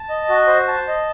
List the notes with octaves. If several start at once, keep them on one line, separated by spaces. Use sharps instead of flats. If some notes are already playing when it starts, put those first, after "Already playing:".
Already playing: A5
D#5
F#4
C5
A5
D#5